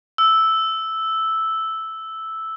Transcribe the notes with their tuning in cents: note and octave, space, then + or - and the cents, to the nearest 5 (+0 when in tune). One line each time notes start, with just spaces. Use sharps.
E6 -5